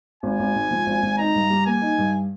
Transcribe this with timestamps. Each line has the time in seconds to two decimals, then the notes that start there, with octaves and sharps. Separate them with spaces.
0.23 G#1 G#5
0.39 G#1
0.55 G#2
0.71 F3
0.87 G#1
1.03 G#1
1.18 D#4 A#5
1.35 G2
1.50 G3
1.66 A#3 G#5
1.81 D#4
1.98 G2